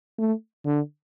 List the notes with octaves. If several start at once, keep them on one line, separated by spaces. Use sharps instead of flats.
A3
D3